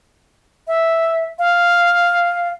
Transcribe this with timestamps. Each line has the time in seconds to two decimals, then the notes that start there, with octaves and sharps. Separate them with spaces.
0.68 E5
1.39 F5